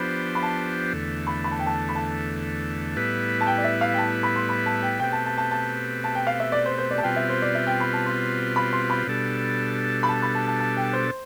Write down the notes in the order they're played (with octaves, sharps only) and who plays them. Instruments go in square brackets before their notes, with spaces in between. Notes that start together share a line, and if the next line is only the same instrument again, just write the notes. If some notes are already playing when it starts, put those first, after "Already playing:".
Already playing: [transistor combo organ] F3 B3 D4 G4 C5 [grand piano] B5
[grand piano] B5
A5
[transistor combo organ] E2 D3 A3
[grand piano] B5
B5
A5
G5
A5
B5
A5
[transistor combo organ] A2 G3 B3 E4 B4
[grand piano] A5
G5
D5
E5
F5
G5
A5
B5
C6
B5
A5
G5
[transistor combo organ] B2 A3 C4 G4 B4 [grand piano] G5
[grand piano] A5
A5
A5
A5
A5
G5
F5
E5
D5
C5
C5
D5
A5
[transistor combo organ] B2 G3 C4 F4 B4 [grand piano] G5
[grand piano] E5
C5
D5
E5
G5
B5
A5
C6
B5
C6
B5
[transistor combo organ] B2 G3 D4 A4
[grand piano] B5
A5
B5
A5
A5
A5
G5
C5